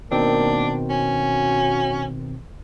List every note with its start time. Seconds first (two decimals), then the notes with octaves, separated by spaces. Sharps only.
0.11 B2 D#3 A#3 C4 D4
0.90 C#4 F#4